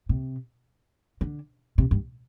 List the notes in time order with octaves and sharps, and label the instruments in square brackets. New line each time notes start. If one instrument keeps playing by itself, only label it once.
[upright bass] C3
D3
C3
G2